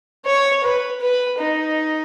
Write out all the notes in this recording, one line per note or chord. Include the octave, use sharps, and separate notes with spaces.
C#5
B4
B4
D#4